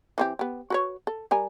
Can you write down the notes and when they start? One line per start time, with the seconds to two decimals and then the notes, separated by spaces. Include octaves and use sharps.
0.18 E3 C4 G4
0.39 B3 G4
0.70 F#4 B4 C#5
1.07 A4
1.31 G3 A#4 G#5